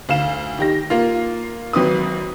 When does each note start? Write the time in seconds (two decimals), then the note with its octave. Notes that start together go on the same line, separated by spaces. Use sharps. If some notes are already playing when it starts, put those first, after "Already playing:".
0.09 D2 F5 E7
0.58 D#3 G4 A#6
0.90 A#3 F4
1.73 G#1 F#3 C4 B4 D#6